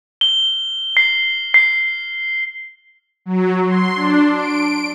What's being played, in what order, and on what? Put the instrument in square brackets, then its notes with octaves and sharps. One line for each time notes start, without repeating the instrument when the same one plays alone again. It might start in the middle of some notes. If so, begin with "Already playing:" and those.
[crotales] G7
C7
C7
[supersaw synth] F#3
C6
D4
D7